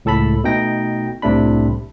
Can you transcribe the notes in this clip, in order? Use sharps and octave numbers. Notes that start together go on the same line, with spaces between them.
C#2 A2 A4 A5 B5
B2 A3 D#4 G5 A#6
C2 A2 C3 A3 D4 B5